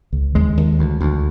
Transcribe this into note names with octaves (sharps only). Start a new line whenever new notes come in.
C#2
D#2 G#3
D#2
D2
D2